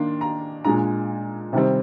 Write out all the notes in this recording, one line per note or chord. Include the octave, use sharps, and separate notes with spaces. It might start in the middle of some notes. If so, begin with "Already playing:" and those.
Already playing: D#3 A#3 D4 C6
A#5
A#2 G#3 D4 A#5
C3 D#3 G3 C4